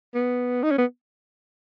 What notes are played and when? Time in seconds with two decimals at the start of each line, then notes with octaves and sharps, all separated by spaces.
0.15 B3
0.63 D#4
0.71 C#4
0.78 B3